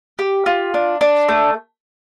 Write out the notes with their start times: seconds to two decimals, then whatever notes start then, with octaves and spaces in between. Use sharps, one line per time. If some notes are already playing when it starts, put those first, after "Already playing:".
0.19 G4
0.46 F4
0.74 D4
1.01 D4
1.29 A3